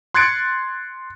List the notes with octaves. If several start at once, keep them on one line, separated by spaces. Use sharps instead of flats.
C6 F#6 G#6 A6 C#7 D7